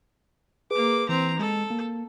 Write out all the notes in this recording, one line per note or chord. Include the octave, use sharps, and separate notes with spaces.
A#3 G#4 B4 D6
E3 C4 A#5
G#3 A4
A#3